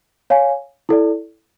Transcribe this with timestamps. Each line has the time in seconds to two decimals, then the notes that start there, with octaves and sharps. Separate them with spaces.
0.30 C#5 F5 G#5
0.89 E4 A4 D5